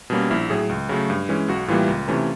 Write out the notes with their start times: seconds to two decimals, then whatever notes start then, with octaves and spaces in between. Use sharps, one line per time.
0.10 B2 G3 A#3 C#4
0.30 A#1 E4
0.50 A2 F#3 G#4
0.69 C#2
0.89 C#3 F#3 A3
1.10 G2
1.29 E3 G#3 C#4
1.48 B1 F#4
1.68 A2 E3 G3 A#3 F4
1.88 C#2
2.08 C3 E3 A3 C#4